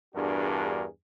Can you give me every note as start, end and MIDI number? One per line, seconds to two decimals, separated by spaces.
0.14 0.85 40
0.14 0.85 43
0.14 0.85 62
0.14 0.85 66
0.14 0.85 68
0.14 0.85 70